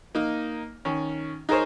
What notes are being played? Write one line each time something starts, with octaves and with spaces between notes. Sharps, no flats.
A#3 D#4
D#3 C#4
D#4 G#4 A#4 C5 C#5